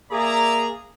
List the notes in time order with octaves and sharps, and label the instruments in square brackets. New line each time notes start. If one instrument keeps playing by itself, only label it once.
[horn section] A#3 G#4 [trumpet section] D5 E5 A#5